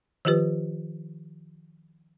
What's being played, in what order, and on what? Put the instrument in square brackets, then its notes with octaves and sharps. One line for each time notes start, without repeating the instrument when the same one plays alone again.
[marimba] D#3 F3 F4 G4 B4